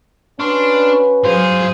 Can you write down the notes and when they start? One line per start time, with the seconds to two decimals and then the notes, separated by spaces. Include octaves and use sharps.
0.40 C#4 D4 F#4 B4 C6 C#6 F6
1.24 G#2 F#3 G#4 C5 F5